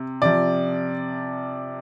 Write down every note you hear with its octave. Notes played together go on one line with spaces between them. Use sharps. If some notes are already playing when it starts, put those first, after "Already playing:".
Already playing: C3
C3 F3 D5